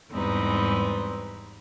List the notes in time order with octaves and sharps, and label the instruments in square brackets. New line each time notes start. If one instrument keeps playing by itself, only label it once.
[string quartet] E2 G#2 G3 C4 D#4 B4